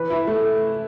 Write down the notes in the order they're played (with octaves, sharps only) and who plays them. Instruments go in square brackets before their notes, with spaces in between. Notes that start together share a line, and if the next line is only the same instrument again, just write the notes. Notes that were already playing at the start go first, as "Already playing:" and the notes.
Already playing: [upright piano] E3 B4
E4
A3